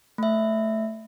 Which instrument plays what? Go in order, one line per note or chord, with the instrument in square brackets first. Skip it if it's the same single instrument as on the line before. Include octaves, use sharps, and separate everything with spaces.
[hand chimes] A3 E5